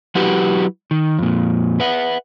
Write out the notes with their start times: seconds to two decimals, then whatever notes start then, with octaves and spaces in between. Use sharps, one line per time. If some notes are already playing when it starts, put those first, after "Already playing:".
0.15 F#3 E4 F#4 G4 B4
0.91 D#3
1.19 F2 A#2
1.80 B4 E5 F#5